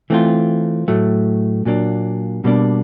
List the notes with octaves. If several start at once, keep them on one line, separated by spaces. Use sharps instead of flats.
E3 A3 C4 F4
A2 F#3 A3
A#2 F#3 A#3 D4
B2 G3 A#3 D4